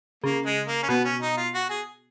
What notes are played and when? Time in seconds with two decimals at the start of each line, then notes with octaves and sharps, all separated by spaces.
0.24 C#3 A#3
0.45 G#3
0.67 A#3
0.83 C#4
0.89 B2 B3
1.05 C#4
1.21 D#4
1.37 F4
1.54 F#4
1.70 G#4